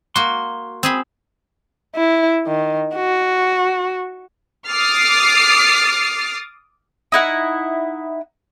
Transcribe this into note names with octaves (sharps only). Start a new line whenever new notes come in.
A#3 F#4 C6
C4 G#4 B5
E4
D#3
F#4
D6 D#6 F6 A6 C7
D#4 E4 F#5